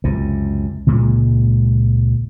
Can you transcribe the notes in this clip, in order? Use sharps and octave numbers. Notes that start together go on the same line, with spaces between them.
C#2 F#2 C3
C#2 A#2 G#3